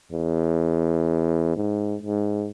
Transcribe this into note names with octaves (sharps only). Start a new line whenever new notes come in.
E2
G#2
G#2